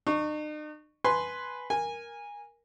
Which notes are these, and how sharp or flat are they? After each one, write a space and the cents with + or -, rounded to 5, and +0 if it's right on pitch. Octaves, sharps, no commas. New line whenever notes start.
D#4 -45 C#6 +0
B4 +0 G#5 +10 C6 +0
A#4 +5 G#5 -15